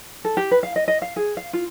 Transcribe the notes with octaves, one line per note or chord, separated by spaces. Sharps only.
A4
G4
B4
F5
D#5
D#5
F5
G#4
F5
F4